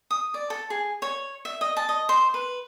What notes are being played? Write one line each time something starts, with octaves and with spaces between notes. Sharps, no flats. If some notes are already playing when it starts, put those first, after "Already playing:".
D#6
D5
A4
G#4
C#5
E5
D#5
A5
D#5
C5
B4